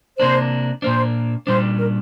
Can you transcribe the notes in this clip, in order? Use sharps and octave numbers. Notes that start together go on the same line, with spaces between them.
C3 A#3 D4 C5
A#2 A#3 D4 C5
A#2 G3 D4 C5
A#4